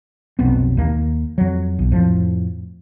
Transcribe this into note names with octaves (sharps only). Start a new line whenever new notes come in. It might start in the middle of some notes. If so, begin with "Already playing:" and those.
F1 B1 B3 C4
D#2 A#3
F2 F#3
B1
F2 A2 F3